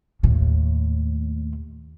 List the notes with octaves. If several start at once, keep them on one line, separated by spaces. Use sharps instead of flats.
D#2 A2